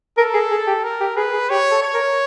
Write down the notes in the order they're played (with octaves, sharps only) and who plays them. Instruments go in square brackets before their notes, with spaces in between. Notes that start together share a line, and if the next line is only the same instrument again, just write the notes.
[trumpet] A4 [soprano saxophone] A#4
[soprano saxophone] G#4
G#4
G4
[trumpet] A#4
[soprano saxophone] G4
[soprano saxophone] G#4 [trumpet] B4
[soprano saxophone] G#4
[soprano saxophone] G4 [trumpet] C#5
[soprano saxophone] A4
[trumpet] C#5
[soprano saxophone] A#4